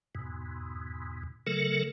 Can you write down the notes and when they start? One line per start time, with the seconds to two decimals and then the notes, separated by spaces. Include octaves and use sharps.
0.15 E2 G#2 B2
1.47 C#3 F#3 A3 A4 A#4